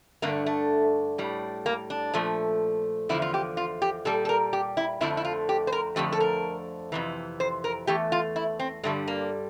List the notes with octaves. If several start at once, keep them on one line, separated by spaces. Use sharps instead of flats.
G2 D3 A3 A#3
A3
A2 G3
A#3
D4
A#2 F3 A3
E2 D3 F3 E4
F4
G4
F4
G4
A#2 G3 A4
A4
A#4
G4
E4
F2 D3 F3 A3 E4
E4
F4
G4
C5
A#4
F2 D3 F3 A3 G4
A4
A#4
F2 C3 E3
C5
A#4
E2 E3 A3 G4
F4
E4
C4
G2 D3 G3 A3
A#3